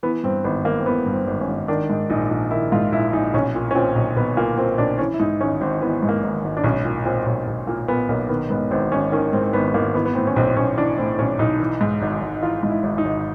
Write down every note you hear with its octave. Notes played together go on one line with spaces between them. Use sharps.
E3 B3
G2 C4
G#1 B3
G#1 A#3
C4
E3 B3
G2
C4
G#1
C#4
G#1
D#3 D4
G#2
A#1 D#4
A#1
D#3 E4
G#2 F4
A#1 E4
A#1 D#4
B1 C#4
A#2
C#4
A#2 C4
B1
B1 B3
A#2 A#3
A#2 C4
B1 D4
E3 C#4
E4
G#2 D#4
G#1 C#4
G#1 C4
E3 B3
G#2
A#3
G#1
G#1
D4
B1 C#4
A#2
A#2 C4
B1
B1
A#2 A#3
A#2 B3
B1 A#3
D#3 B3
G#2 B3
G#1 C4
G#1 C#4
D#3 C#4
G#2 C4
C4
G#1 B3
G#1 A#3
E3 B3
B3
A2 C4
C#4
B1 C4
B1 C#4
E3 D4
A2 C4
B1 C#4
B1 D#4
E3
G#2
G#1
G#1
E3 F4
G#2
E4
G#1
D#4
G#1